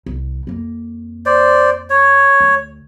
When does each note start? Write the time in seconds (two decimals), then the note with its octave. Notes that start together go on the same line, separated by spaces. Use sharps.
0.06 C2
0.47 F2 A#3
1.26 C5 D5
1.90 C#5
2.40 D2